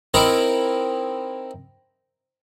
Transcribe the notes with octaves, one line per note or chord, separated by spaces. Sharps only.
C4 D#4 E4 A#4